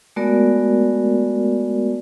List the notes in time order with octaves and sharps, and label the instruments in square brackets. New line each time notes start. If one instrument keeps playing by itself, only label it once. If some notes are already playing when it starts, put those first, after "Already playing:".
[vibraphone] G#3 A3 B3 F#4 A#4 D5